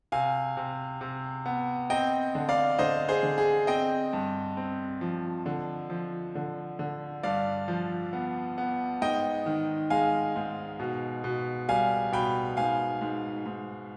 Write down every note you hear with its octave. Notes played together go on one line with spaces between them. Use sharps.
C3 F5 G#5
C3
C3
B3
C4 D#5 G5
D3
D5 F5
D3 C5 D#5
G#4 C5
D3
G#4
C4 D#5 G5
G2
C4
F3
D3
F3
D3
D3
G2 D5 F5
F3
B3
B3
G#2 D#5 G5
D#3
G#3 F5 G#5
G#2
B2
B2
G3 F5 G#5
B2 G5 B5
G#2 F5 G#5
G#2
G#2